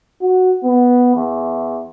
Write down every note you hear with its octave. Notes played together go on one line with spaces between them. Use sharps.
F#4
B3
E2